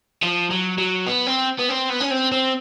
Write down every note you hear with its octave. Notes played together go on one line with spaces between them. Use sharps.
F3
F#3
F#3
B3
C4
B3
C4
B3
C#4
C4
C4